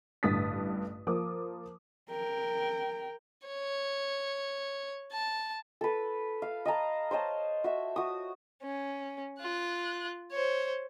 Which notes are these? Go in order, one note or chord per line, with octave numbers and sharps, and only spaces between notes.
A1 G2 D3 D#6 A6 B6
F3 A#3 D6 D#6
A#4 G5
C#5
A5
A4 B4
F5
D#5 A5 A#5
C5 C#5 D#5 A5
F#4 E5
F#4 D#6
C#4
F4 F#6
C5 C#5